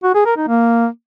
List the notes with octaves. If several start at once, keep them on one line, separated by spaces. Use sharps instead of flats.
F#4
G#4
A#4
D#4
A#3